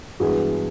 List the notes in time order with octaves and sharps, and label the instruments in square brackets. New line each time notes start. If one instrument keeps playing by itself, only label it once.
[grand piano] G2 E3 G#3 B3 F#4 G#4